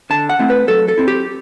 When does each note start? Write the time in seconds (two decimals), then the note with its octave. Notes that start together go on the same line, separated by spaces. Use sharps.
0.10 D3 A5
0.29 F#5
0.39 A3 C4 E4
0.50 B4
0.68 F#3 A4
0.88 A4
0.98 C4 E4
1.08 G4